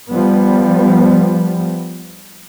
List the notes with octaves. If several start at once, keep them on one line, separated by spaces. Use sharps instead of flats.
F3 G3 B3